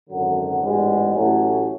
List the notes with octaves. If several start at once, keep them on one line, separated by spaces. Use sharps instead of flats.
G#1 F#2 D3 F#3
A1 G#2 G#3 B3 D4
A1 A2 F#3 A3 C#4